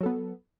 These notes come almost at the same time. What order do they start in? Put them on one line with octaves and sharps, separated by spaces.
F#3 A4 B3